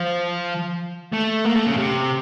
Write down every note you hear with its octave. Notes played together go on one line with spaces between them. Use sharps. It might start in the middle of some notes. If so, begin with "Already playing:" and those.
Already playing: F3
A3
A#3
A3
C#3
C3